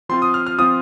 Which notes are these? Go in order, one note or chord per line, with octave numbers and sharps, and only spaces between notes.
F3 C4 F4 C6
D#6
F6
F6
F3 C4 F4 D#6